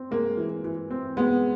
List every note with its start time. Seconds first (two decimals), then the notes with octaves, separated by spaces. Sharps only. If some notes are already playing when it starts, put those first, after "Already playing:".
Already playing: C4
0.11 G#3 A#3
0.37 E3
0.64 E3
0.91 C4
1.17 G#3 B3